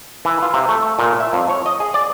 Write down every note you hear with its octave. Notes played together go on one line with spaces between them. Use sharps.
E3
F4
C3
A3
A#2
E5
F2
C#5
D#5
G#4
D5